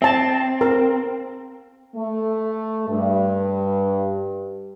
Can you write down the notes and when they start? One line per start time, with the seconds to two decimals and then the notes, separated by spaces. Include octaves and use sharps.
0.02 C4 E5 A5
0.61 A#4
1.96 A3
2.89 G2